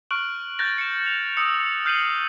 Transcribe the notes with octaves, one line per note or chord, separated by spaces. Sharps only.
C#6 F6 F#6 D7 F#7
F#6 G6 A6 A#6 F#7
C#7 E7
F7
D#6 E6 C#7
F6 G6 C7 D#7 F#7